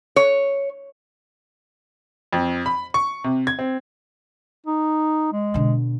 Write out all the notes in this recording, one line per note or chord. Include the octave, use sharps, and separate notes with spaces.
C#5
F2
B5
C#6
C3
G#6
C4
D#4
G#3
B2 D3